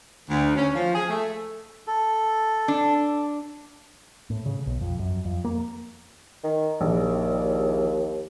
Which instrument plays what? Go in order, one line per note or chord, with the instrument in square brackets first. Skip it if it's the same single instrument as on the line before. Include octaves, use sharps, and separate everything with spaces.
[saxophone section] D2
C#4
F3
G#4
A3
[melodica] A4
[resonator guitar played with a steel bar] D4
[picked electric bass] A2
C#3
B1
F2
F#2
F2
A#3
[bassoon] D#3
[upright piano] A#1 [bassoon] D#2